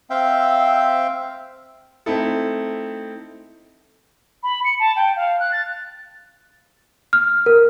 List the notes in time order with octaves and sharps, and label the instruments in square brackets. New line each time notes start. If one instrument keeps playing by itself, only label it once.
[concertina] C4 E5 F5 G5
[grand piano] A3 C4 D#4 E4 A4
[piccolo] B5
C#7
A5
G5
F5
F#6
A6
[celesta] F6
A#4